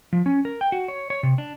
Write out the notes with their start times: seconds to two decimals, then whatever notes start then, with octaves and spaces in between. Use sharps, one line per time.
0.13 F3
0.26 C#4
0.45 A#4
0.61 G5
0.72 F#4
0.88 C#5
1.10 C#5
1.23 C3
1.38 D4